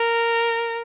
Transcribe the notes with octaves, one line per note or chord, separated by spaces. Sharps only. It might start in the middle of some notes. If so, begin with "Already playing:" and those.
Already playing: A#4